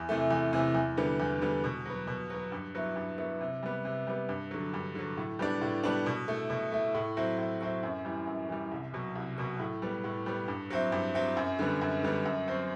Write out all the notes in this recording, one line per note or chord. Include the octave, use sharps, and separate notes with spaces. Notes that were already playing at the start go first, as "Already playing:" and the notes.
Already playing: E2
C3 E3 A3
E2
C3 E3 A3
E2
D3 G3 B3
E2
D3 G3 B3
B2
F#3 B3
B2
F#3 B3
G2
F#3 B3 E4
G2
F#3 B3 E4
C3
G3 B3
C3
G3 B3
G2
D3 F#3
G2
D3 F#3
A2
G3 B3 D4
A2
G3 B3 D4
B2
A3 E4
B2
A3 E4
A2
F#3 C4 E4
A2
F#3 C4 E4
F#2
E3 G3
F#2
E3 G3
C2
B2 F#3
C2
B2 F#3
A2
G3 B3
A2
G3 B3
G2
F#3 C4 E4
G2
F#3 C4 E4
F#2
D3 G3 B3
F#2
D3 G3 B3
F#2
F#3 C4